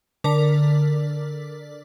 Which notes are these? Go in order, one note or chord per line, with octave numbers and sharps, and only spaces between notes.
D3 A#4 D5 D6 B6